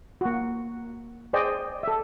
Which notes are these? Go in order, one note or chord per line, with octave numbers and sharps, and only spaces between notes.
A#3 F#4
G#4 C5 D5 D#5 G5
A4 E5